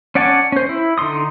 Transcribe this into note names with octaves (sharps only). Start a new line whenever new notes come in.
C#4 D5 F#5 G#5 A5
C#4 C5
E4
D3 D#4 C6 D#6